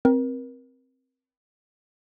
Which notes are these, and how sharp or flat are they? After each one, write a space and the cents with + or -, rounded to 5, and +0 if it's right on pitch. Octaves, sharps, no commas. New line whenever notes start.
C4 +0 A#4 +30